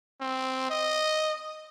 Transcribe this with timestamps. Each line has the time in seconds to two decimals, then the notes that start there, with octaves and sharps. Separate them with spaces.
0.21 C4
0.70 D#5